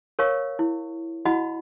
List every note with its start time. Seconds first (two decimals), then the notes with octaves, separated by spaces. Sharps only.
0.19 A#4 C#5 F5 C#6
0.59 E4
1.25 E4 F#4 D#5 F#5 B5